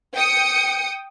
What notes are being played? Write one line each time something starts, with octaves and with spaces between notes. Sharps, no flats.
G5 D#6 C#7